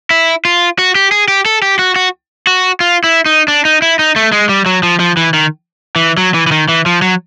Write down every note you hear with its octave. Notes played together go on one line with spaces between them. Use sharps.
E4
F4
F#4
G4
G#4
G4
A4
G4
F#4
F#4
F#4
F4
E4
D#4
D4
D#4
E4
D#4
A3
G#3
G3
F#3
F3
F3
E3
D#3
E3
F#3
E3
E3
D#3
E3
F3
F#3